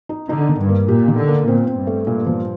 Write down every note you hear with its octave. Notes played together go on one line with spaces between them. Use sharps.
D#4
D3 D#4
D#3
G2
A#3
A#2 G4
D#3
D3
A#3
A#2 C4
C4
G2
A3
A#2
F3